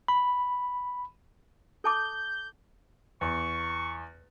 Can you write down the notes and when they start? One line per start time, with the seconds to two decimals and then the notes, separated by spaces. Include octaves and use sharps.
0.08 B5
1.84 A4 A5 D6 G6
3.21 E2 C#6